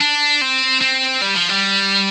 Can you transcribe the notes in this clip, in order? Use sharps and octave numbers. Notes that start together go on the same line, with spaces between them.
D4
C4
C4
G3
F3
G3